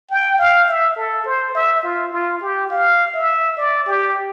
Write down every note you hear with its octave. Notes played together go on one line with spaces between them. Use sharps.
G5
F5
E5
A4
C5
E5
F4
F4
G4
F5
E5
D5
G4